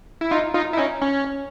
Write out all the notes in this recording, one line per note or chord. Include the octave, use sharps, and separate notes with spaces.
E4
D#4 F4
D#4 F4
E4
C#4 D#4
C#4